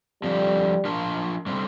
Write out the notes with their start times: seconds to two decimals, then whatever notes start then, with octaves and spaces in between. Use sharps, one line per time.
0.23 D3 F3 G3 C4 G4
0.85 F3 D4 F4 A#4
1.47 D3 G3 C4